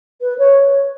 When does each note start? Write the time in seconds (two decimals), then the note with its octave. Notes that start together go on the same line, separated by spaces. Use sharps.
0.21 B4
0.38 C#5